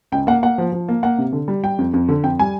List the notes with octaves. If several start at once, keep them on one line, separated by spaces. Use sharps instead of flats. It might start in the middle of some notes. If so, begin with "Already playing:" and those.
C#2 G5
A#3 F#5
A#3 F#5
F3
F3
A#3
A#3 F#5
C3
D3
G3
G3 G5
F2
F2
D3
F2 G5
G3 G#5